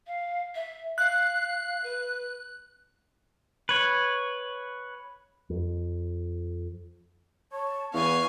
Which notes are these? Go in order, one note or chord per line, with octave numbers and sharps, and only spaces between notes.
F5
E5
F5 F#6
B4
B4 C#5
F2
C#5 A5
E2 B3 F5 G#5 C#6